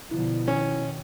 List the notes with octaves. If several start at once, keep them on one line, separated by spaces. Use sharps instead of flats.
B2 D3 F3 E4
D#3 C#4